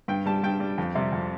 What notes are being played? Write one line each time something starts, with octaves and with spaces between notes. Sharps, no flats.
G2 G5
G3 A5
G2 G5
G3
F2
C3 G3
F2